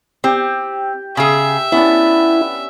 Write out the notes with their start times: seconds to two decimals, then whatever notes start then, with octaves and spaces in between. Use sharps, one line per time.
0.24 C4 G4
1.17 C#3 G#4 E5
1.72 B3 C#4 D4 E4